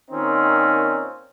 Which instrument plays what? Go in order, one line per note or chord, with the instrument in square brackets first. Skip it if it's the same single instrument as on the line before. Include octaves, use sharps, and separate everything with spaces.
[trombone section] A#2 D#3 C4 C#4 D#4